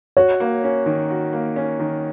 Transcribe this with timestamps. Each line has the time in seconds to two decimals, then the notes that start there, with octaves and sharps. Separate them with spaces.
0.17 F#4 C#5
0.40 A#3
0.64 C#4
0.86 D#3
1.10 F#4
1.33 A#3
1.56 C#4
1.79 D#3